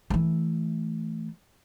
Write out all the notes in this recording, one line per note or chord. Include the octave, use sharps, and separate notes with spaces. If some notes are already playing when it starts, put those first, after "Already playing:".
E3 A3